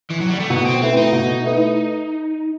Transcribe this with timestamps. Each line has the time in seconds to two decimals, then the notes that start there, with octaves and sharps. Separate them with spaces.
0.10 E3
0.20 F#3
0.30 G3
0.39 A3
0.50 B2 B3
0.65 C4
0.81 A3 C4 E4 B4
0.97 D#4
1.12 B2
1.43 A3 E4 B4